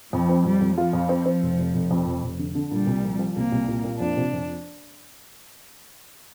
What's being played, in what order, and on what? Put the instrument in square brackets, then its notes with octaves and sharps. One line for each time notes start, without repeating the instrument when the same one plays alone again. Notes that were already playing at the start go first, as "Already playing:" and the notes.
[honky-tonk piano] F2 [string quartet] F3
[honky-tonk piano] C4
[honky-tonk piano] F2 [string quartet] G3
[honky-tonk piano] F2
[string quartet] F3 [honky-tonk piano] F4
[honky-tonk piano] F2
C4
C4
F1
F1
F1
F2
F1
F1
D3
D3
[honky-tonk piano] A#2 [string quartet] G3
[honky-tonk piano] C2
F3
F3
[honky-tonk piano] C2 [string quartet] A#3
[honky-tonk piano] C2
A#2
A#2
[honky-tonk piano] F2 [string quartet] D4
[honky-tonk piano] C3
F2